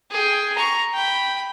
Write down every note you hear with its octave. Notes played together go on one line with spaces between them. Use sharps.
G#4 G5
A#5 C#6
G5 B5